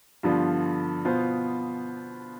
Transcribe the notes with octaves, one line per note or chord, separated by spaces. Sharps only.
G2 D3 F3 B3 F4
B2 B3 F4 C5